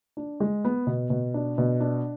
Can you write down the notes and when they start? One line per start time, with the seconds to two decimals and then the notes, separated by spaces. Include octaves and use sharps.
0.17 D4
0.40 G#3
0.65 B3
0.87 B2
1.10 B2
1.34 D4
1.58 B2
1.80 D4